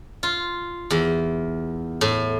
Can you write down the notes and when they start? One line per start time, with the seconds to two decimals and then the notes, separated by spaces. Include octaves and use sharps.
0.23 F4
0.90 E2
2.01 A2